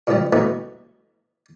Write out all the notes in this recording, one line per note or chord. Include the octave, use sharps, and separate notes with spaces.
A#2 C#3 E3 F3 G3
C2 B2 E3 A3 A#3